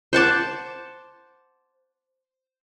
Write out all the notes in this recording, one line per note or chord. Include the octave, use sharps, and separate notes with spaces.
C5 F#5 A5 D6